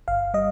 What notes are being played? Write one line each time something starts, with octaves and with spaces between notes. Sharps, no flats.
G1 F5
G3 D#5